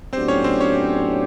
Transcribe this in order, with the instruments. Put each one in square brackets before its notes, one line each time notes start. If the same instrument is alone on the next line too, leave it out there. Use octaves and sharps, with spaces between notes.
[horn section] A2 F#3 B3 D4 G4 [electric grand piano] C4 C5
[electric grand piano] C#4 C#5
C4 C5
C#4 C#5